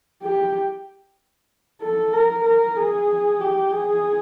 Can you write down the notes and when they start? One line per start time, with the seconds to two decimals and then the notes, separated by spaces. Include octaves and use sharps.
0.23 G4
1.82 A4
2.13 A#4
2.45 A#4
2.77 G#4
3.41 G4
3.72 G#4